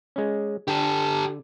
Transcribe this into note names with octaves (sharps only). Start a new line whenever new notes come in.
G#3 C#4
D3 G4 A4